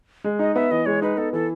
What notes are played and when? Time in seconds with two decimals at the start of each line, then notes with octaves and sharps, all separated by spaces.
0.24 G#3
0.39 D#4 D#5
0.55 B3 E5
0.71 E3 D#5
0.86 G#3 C#5
1.02 D#4 B4
1.18 B3 A4
1.33 E3 A4